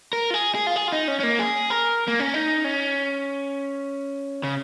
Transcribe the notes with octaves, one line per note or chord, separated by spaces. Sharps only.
A#4
F4
G#4
G#4
F4
G#4
F4
D#4
C#4
C#4
A#3
G#4
A#4
A#3
C#4
D#4
C#4
C#3